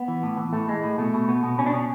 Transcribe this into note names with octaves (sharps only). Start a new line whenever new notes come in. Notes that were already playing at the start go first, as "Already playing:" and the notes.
Already playing: B3
E3
A2
E3
A2 A3
E3 G#3
A2
B2 A3
B2
B2 B3
B2
B2 C#4
D4
B2 C#4